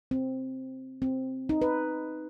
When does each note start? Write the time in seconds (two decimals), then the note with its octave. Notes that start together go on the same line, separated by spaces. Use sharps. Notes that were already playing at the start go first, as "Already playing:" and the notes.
0.11 C4
1.02 C4
1.49 D#4
1.62 B4